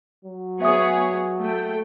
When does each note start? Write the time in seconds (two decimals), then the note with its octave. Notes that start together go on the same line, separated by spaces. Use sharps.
0.25 F#3
0.62 B3 G#4 C#5 E5 D#6
1.41 A3 G5